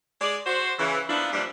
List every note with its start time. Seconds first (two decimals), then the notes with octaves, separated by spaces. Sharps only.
0.21 G#3 G#4 D5
0.45 F#4 C5
0.79 C#3 E3
1.08 F3 A#3 B3 D4 E4
1.32 A#2 E3 F3 G3 D4